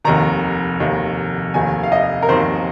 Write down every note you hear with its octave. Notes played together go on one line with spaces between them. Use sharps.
F1 D#2 D#3 A#5
F1 D#2 D#3
F1 D#2 D#3 G#5
F5
D#5
A#4
F1 D#2 D#3 C5